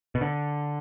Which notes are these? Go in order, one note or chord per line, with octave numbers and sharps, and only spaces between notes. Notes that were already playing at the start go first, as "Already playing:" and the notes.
B2
D3